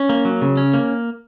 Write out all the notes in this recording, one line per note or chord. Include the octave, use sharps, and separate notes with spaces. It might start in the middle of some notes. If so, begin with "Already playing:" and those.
Already playing: C#4
A#3
F#3
C#3
C#4
A#3